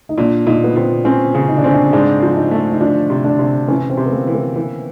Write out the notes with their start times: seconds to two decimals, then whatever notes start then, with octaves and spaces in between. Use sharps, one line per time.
0.09 D#4
0.18 A#2 D4
0.47 A#2 D#4
0.64 B3
0.76 A#2 C4
1.05 C4 C#4
1.35 C#3
1.49 D#4
1.58 D4
1.64 C4 C#4
1.74 D4
1.93 G#2 D4
2.22 F3
2.37 D#4
2.51 A3
2.72 D#4
2.81 F3 D4
3.10 C3
3.24 D4
3.39 C3
3.68 E3 C#4
3.90 C4
3.97 C3
4.06 B3
4.12 A#3
4.27 E3
4.34 A#3
4.56 E3 B3